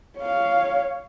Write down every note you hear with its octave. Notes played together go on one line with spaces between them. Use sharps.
C#5 F5